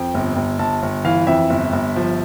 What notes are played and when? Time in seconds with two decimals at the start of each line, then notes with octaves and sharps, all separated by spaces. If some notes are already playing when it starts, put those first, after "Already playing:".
Already playing: F2 G5
0.14 G1
0.36 G1
0.59 G1 A5
0.83 G1
1.05 E3 F5
1.27 F2 E5
1.50 G1
1.73 G1
1.96 F3